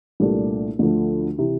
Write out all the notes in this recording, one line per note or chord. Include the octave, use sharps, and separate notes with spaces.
C2 A#2 A3 D4 G4
D2 D3 F3 A3
C3 E3